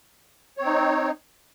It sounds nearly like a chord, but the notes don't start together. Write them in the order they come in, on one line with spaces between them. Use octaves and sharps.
C#5 C4 D#4